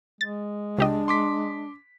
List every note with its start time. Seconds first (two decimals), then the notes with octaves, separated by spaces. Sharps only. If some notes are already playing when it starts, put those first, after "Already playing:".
0.21 G#3 A6
0.78 C#2 D4 G4 D#5
1.08 C6 D6 B6